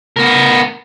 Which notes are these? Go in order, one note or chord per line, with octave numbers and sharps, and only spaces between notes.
B3 A#4